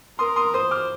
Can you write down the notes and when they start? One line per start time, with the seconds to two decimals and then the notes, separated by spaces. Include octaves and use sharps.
0.19 A#4 C6 D#6
0.36 C6 D#6
0.54 C5 C6 D#6
0.71 D6 F6